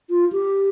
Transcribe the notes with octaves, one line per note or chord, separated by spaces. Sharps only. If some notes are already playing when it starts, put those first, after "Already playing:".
F4
G4